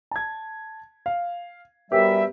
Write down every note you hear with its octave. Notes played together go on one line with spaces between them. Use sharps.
A5 G#6
F5
F#2 G3 B3 G4 E5